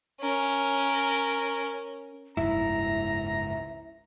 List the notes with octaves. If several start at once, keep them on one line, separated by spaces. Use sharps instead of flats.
C#4 A#4
F#1 C#2 G#2 E4 E5 A#5